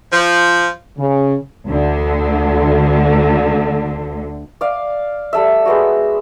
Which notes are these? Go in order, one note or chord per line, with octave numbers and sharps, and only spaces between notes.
F3
C#3
D2 D3
D5 F5
G3 A4 E5
G#3 B3 F#4